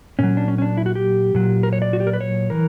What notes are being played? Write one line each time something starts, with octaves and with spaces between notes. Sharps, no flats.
A#2 F#3 C#4
D4
C#4
C#4
D4
E4
F#4
G4
A#2 F#3
A#4
C#5
D5
F#4
G4
A#4
B4
C#5
E3 A#4